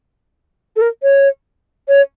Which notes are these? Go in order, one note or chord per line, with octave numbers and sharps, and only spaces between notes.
A4
A#4
C#5
C#5